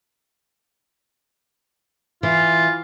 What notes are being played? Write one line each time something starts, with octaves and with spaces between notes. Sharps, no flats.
E3 F4